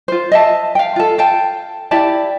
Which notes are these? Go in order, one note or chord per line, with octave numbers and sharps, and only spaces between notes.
F4 C5
D#5 E5 A5
F5 G5
F4 A4
F5 G5 A5
E4 G4 D5 A5